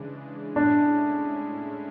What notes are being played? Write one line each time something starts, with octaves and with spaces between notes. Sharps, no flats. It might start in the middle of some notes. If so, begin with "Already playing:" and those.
Already playing: C#3 E3 G#3 D4
A2 G#3 C#4 D4 E4